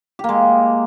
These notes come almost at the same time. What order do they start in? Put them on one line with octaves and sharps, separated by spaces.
G4 A#3 G#3